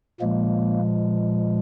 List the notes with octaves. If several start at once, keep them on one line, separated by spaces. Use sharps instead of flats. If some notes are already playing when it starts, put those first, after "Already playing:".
A#2 F3 G#3 A#3